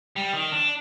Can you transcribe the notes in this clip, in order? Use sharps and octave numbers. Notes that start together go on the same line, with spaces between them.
G3
D#3
D4